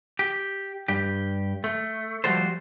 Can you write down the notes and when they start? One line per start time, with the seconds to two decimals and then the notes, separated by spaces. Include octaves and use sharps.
0.19 G4
0.88 G2 G4
1.64 A3
2.24 F3 G3 A3 F#4 A4 C5